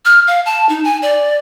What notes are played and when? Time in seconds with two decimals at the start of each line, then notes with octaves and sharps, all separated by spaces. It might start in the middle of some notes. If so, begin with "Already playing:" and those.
0.05 F6
0.27 F5
0.46 A5
0.69 D#4
0.84 G#5
1.02 D5